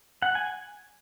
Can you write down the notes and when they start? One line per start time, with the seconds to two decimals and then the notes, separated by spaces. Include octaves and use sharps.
0.22 F#5
0.35 G#5